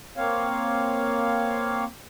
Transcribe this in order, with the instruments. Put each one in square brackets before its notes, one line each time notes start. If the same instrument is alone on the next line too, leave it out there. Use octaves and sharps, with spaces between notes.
[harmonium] A#3 C4 C#5 F5